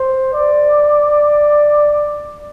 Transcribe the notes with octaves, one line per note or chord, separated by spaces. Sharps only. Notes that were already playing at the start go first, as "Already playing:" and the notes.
Already playing: C5
D5